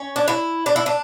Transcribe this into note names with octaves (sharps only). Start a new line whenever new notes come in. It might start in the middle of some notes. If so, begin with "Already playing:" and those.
Already playing: C#4
D4
E4
D4
E4
D4